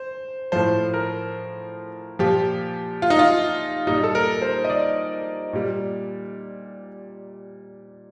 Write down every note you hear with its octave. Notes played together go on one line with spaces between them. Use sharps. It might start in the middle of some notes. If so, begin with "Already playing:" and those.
Already playing: C5
A2 F3 C5
A#4
A#2 F3 G4
F4
D#4
F4
A#2 G3 D#4
A4
A#4
C5
D#5
D5
A#2 G3